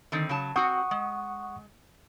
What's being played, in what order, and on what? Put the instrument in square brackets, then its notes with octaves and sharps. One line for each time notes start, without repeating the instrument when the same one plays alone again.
[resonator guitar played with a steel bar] D3 D#3 C4
C#3 F#3 A5
[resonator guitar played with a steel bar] C4 F#4 [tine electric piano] F#5 C#6 D#6
[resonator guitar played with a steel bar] G#3